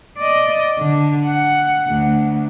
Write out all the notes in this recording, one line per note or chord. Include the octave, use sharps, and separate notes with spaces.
D5 D#5
D3
F#5
D2